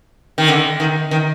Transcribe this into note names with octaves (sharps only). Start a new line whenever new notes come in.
D#3
D3
D#3
D#3